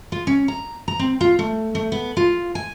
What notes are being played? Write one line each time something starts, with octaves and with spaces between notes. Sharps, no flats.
F4
C#4
A#5
A#5
C4
F4
A3
A3
B3
F4
G#5